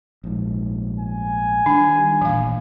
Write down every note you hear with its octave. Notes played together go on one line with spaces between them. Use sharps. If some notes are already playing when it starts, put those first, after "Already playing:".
A#1 G#2
G#5
D#3 G3 D4
D#1 A1 A#2 E3 F5